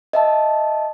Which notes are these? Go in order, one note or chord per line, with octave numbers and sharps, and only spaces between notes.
D#5 E5 A5